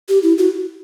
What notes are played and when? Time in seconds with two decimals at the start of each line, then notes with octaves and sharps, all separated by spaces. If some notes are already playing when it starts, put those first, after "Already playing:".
0.09 G4
0.23 E4
0.38 F#4